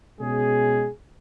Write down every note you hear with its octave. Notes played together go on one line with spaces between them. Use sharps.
B2 G#3 C#4 G#4